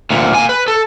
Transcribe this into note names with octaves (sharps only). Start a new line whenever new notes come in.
D2 A#2
A#3 G#5
B4
A4